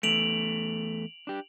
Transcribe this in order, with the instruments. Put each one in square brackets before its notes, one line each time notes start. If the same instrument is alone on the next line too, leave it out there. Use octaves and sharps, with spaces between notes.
[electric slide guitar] E2 A3 [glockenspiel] D7 F7 F#7
[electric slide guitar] D4 G4